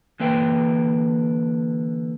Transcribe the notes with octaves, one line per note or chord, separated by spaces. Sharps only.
D3 E3 A#3 B4 G5